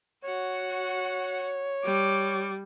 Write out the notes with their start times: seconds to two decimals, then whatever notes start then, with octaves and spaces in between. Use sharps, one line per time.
0.24 F#4 C#5 F#5
1.85 G3 D6